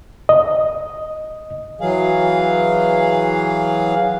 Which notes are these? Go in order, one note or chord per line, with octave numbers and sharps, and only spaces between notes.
D#5
E3 F#3 G#4 F5